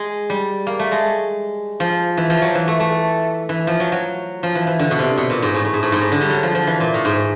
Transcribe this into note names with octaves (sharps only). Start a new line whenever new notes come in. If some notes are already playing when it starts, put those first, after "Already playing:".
Already playing: G#3
G3
A#3
A3
G#3
F3
E3
F3
F#3
E3
A3
A3
E3
F3
F#3
F#3
F3
E3
E3
D3
B2
C3
B2
A#2
G#2
A2
A2
G#2
A2
G#2
A2
D3
G3
F#3
F3
F3
E3
A#2
A2
G#2